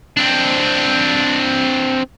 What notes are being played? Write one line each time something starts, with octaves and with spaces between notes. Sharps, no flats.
C4 D4